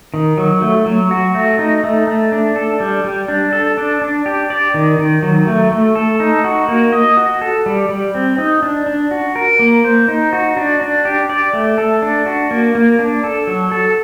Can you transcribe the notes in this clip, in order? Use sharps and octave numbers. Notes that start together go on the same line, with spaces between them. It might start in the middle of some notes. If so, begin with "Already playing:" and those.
D#3
F#3
A3
F#3
F#4
A3
D#4
A3
A3
D4
A4
G3
G3
D4
A4
D4
D4
G4
D5
D#3
D#3
F#3
A3
A3
A4
D#4
F#4
A#3
D#5
F#4
A4
G3
G3
C4
D#4
D4
D4
F#4
A#4
A#3
C5
D#4
F#4
D4
D4
G4
D5
A3
A4
D4
F#4
A#3
A#3
D4
A4
F#3
A4